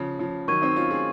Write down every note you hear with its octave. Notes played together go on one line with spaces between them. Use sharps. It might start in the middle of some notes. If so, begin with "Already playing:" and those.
Already playing: C#3 F3
C#3 F3
D#3 F#3 C#6 G#6 D#7
C4 D#4
C#4 F4
F4 G#4